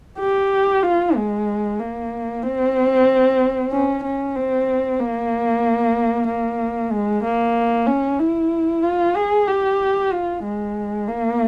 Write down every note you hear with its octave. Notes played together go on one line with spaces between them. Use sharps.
G4
F4
G#3
A#3
C4
C#4
C#4
C4
A#3
A#3
G#3
A#3
C#4
E4
F4
G#4
G4
F4
G#3
A#3